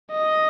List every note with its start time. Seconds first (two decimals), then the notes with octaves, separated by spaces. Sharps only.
0.11 D#5